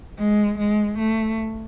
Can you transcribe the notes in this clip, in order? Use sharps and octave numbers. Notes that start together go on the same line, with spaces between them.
G#3
G#3
A3